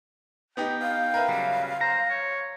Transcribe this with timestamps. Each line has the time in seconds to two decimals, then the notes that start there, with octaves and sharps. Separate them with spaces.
0.57 B3 D#4 G4 G5
0.82 F5
1.14 A#4 B4 E5
1.29 C#3 F#3 G3
1.81 C5 A#5
2.10 C#5